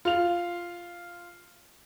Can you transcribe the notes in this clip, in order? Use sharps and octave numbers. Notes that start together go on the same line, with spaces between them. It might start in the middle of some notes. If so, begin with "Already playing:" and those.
F4 F7